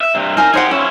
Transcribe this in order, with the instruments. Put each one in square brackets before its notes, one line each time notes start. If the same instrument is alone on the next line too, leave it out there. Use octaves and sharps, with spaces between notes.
[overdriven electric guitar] E5
G2 C3
[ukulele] D#4 C5 G#5 [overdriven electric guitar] A#4
[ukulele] D#4 C5 F#5 [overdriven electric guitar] G4 G#4
[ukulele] C#4 [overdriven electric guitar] E4 F4